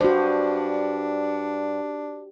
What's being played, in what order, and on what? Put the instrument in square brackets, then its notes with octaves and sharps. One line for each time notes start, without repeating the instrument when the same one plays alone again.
[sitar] G2 [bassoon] D4 [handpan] F#4 C5